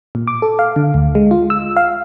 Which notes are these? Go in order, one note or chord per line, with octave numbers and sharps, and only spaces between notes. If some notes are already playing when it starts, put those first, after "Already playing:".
A#2
D6
A4
F5
D3
D2
G#3
F4
E6
F5